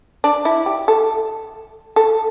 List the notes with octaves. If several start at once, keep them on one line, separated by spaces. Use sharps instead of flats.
D4
E4
G4
A4
A4